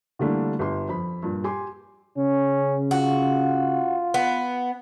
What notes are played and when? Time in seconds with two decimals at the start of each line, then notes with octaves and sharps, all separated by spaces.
0.19 D3 E3 G3 A3 A#3 D4
0.59 G1 G4 C6
0.89 F2 B5
1.23 G2 A#2
1.44 G4 G#5 C6 D6
2.17 C#3 C#4
2.91 F4 F#4
4.14 B3